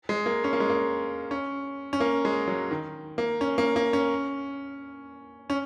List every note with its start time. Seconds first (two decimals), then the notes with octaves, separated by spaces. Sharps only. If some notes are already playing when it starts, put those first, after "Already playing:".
0.09 G#3
0.26 A#3
0.44 C#4
0.53 A#3
0.60 G#3
0.70 A#3
1.31 C#4
1.93 C#4
2.00 A#3
2.25 G#3
2.48 F#3
2.71 D#3
3.18 A#3
3.41 C#4
3.58 A#3
3.76 A#3
3.93 C#4
5.50 C#4